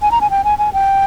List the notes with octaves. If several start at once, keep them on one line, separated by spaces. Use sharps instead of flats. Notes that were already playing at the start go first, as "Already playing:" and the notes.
G#5
A#5
G#5
G5
G#5
G#5
G5